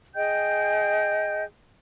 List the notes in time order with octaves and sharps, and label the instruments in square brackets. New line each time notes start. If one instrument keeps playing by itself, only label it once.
[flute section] G#4 D#5 G5 G6